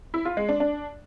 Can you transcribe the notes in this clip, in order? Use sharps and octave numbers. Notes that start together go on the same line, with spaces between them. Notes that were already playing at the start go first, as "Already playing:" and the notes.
E4
F4
G#3
D4
D4